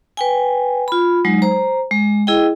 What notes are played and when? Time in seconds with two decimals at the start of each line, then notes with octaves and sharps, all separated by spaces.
0.17 B4 G5 G#5
0.88 F4 B5
1.25 F#3 G#3 D#4
1.42 C5 A#5
1.91 G#3
2.27 E4 G#4 D#5 G5